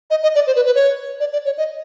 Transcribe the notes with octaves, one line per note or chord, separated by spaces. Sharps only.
D#5
D#5
D5
C5
B4
B4
C#5
D5
D5
C#5
D#5